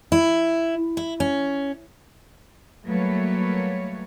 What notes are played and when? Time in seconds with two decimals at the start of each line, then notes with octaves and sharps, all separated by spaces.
0.12 E4
0.97 E4
1.20 C#4
2.85 F#3 G3 A3 A#3 B4 C#5